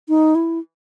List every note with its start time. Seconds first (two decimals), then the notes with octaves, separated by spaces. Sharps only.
0.09 D#4
0.35 E4